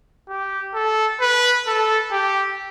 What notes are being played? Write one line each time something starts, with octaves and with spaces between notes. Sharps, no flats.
G4
A4
B4
A4
G4